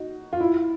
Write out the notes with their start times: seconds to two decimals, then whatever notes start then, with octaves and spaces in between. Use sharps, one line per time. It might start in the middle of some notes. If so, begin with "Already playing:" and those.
Already playing: D#4 F#4
0.33 F4
0.40 E4